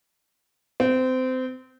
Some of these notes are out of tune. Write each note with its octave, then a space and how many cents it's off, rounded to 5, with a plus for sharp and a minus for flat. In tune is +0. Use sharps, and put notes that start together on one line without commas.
C4 -25